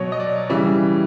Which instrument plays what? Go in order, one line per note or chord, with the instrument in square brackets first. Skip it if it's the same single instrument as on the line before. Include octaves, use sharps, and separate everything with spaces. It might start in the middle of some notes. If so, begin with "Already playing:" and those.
Already playing: [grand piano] B2 F#3 C#5
D#5
D5
C#3 E3 G3 E5